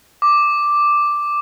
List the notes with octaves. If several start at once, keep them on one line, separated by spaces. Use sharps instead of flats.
D6